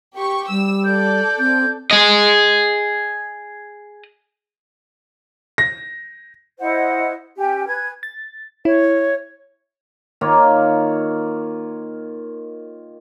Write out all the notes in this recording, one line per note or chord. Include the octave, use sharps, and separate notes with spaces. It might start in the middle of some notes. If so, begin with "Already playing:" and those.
G4 C#6
G3 E6
A4 D5 G6
C4 G6
G#4 D#5
A#6
E4 C5 D#5 F#5
C#4 G4 G5 G#5
B4 G#5 G#6
A6
E4 C#5
D#3 A#3 F4 C#5